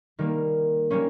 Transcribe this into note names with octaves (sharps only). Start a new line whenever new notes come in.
D#3 G3 A#3
G3 A#3 C#4